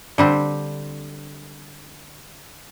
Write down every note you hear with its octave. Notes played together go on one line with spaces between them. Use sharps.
D3 G3 C4